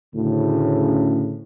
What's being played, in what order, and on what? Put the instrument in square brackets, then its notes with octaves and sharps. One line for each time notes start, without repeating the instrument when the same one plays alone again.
[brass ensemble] D2 A2 C#3